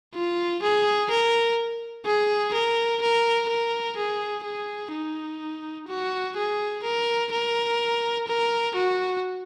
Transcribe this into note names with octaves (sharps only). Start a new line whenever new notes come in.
F4
G#4
A#4
G#4
A#4
A#4
A#4
G#4
G#4
D#4
F#4
G#4
A#4
A#4
A#4
F#4